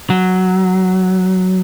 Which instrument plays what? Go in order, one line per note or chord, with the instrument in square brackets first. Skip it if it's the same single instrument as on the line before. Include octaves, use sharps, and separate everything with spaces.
[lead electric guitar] F#3